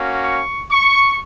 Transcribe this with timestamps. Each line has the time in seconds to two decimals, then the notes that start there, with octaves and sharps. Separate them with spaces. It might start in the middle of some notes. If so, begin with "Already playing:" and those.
Already playing: A#3 C#4 F#4
0.24 C#6
0.70 C#6